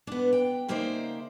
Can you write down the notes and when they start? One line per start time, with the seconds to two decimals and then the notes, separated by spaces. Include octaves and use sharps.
0.07 B3 D4
0.33 G5
0.69 C#3 A#3 D#4 C5 D5 E5